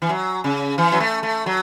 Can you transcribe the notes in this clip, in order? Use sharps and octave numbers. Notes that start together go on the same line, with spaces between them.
E3
F#3
C#3
E3
F#3
A3
A3
F#3